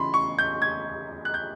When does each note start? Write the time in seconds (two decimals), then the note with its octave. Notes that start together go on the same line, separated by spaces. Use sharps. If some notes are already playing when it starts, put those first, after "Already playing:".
Already playing: C#3 E3 B5 C6
0.14 C#6
0.38 G6
0.62 G#6
1.25 F#6
1.34 G6